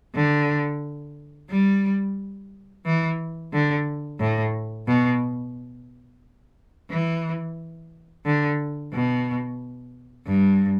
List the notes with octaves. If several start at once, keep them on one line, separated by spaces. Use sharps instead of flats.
D3
G3
E3
D3
A2
B2
E3
D3
B2
G2